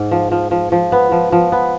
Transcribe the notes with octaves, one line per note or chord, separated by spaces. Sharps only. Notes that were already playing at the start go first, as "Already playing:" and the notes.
Already playing: G#2
F3
F3
F3
F3
B3
F3
F3
B3